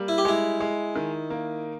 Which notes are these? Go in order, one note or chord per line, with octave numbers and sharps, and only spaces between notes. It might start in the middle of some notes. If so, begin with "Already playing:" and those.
Already playing: G3 A#3
E4
G4
G#3 E4
G#3
D#3
A#3